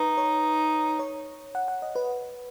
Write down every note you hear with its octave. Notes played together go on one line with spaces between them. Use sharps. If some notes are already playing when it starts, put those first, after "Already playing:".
Already playing: D#4 B4
C#5
C#5
F#5
F#5
D#5
B4